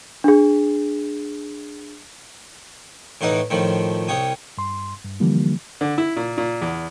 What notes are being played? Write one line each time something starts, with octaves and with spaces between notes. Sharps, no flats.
D4 G#4
A2 E3 D#4 F#5 D#6
A2 D#3 F3
C2 C#5 G5 D#6
G2 C6
G2
D3 E3 F3 G3 A#3
D3
E4
A#2
A#2
E2